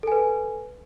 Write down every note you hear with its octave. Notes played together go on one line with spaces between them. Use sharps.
A4 B4 G#5